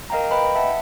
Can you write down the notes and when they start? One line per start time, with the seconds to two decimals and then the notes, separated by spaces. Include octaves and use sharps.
0.10 A#4 D#5 F5 G5 A#5
0.31 B4 D#5 G5 B5
0.55 E5 F#5 A5